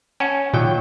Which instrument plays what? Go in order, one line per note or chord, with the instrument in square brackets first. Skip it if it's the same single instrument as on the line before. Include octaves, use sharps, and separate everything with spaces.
[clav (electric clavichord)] C#4 [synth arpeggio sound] F#5 G#5 A5
[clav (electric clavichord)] D#2 F#3 G5 [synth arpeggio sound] A#2